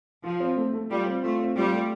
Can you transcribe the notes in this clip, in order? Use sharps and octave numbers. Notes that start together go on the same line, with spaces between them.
F3 F4
C4
A3
A3
G3 F4
C4
A3 F4
C4
G3 F4
A3